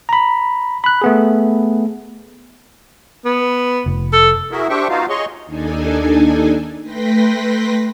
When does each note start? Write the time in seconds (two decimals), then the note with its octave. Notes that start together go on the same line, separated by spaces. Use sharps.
0.09 A#5 B5
0.84 B5 F#6
1.02 A3 B3 G#4
3.25 B3
3.86 F1
4.13 A4
4.51 E4 F#4 G#4 A#4 E5
4.69 D4 G4 C5 E5 G5 C#6
4.89 B3 D#4 F4 F#4 F5
5.09 G#4 C#5 D#5 C6 C#6
5.46 D#2 D4 D#4 A4 G#5
6.83 A3 B4 G5 C6 A#6 B6